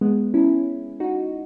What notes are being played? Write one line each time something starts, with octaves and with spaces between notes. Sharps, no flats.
G#3 B3
C#4 E4
D#4 F#4